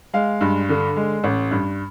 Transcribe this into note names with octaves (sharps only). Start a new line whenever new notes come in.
G#3 F5
G2
D3
G#3
A1
G2